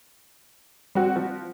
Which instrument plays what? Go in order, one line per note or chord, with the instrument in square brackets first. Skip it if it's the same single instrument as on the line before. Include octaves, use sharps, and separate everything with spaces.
[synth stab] G3 [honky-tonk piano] C4 F#4
[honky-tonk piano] F3